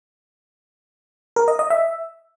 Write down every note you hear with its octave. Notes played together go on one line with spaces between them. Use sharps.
A#4
D#5
D#5
E5